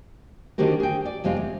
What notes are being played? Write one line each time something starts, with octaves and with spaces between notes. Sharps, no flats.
D3 D#3 C4 F#4 G4 A#4
G#4 G5
D5
F2 C3 G#3 C4 F4
E2